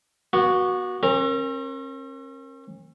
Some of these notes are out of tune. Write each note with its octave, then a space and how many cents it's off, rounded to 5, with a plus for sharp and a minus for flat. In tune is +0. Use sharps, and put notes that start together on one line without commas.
B3 -40 F#4 +0
C#4 -45 A#4 +0